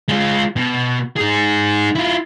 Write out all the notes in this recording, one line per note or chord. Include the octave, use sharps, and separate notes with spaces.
G#3 F4
B2
D#4 G#4
E4 F4